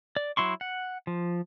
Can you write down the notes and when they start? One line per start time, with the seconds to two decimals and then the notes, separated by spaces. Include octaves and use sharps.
0.16 D5
0.37 F#3 E4 C6 C#6
0.61 F#5
1.07 F3